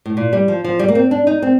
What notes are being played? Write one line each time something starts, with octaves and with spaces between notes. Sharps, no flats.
A2
A#2
G3
F3
F3
G3
A#3
C4
D4
D#4
C4